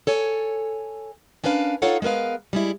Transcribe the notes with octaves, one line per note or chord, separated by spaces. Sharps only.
A4 C#5 G#5
C#4 D4 A#4 B4 F5
D#4 F4 A4 C#5 F5 F#5
G#3 B3 A#4 B4 F5
G3 G#3 E4